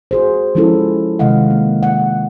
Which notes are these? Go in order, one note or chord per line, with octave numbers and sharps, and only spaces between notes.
F#4 G#4 C5
F3 G#3 C#4 E4 F4 A4
C3 D#3 G#3 D#5 F5 F#5
A#3
F#5